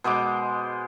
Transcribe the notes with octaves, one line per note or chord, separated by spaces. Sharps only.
B2 G#3 C5 D6